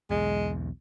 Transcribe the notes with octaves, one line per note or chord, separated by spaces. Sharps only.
B1 E2 G#3